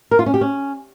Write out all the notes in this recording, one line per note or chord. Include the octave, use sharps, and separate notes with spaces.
A#4
F4
C#4
G4
C#4